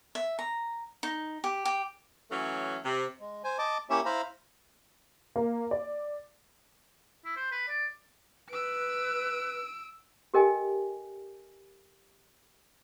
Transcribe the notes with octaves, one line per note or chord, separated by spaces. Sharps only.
E5
A#5
D#4
G4
G4
E3 F#3 A3 C#4
C3
G#3
C5 G#5
D#5 A5 D6
A#3 C#4 E4 G4 C#5 E5
E4 C5 F5 A#5 B5
A#3
D5
E4
C5
B4
D5
B4 E6 D7
G4 A4 A#4 D#5 G5 G#5